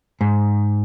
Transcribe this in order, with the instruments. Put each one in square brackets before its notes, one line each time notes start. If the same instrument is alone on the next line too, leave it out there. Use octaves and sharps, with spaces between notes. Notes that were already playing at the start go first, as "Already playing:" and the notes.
[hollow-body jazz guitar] G#2